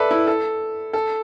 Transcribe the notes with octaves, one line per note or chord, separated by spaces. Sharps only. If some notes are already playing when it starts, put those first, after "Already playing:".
Already playing: A4 B4 D5 E5
E4
A4
A4